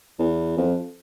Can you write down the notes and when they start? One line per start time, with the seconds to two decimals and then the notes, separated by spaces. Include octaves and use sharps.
0.19 E2
0.57 F2